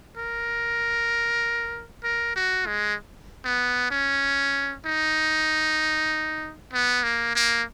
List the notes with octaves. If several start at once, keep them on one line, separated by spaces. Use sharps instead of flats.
A#4
A#4
F#4
G#3
B3
C#4
D#4
B3
A#3
A#3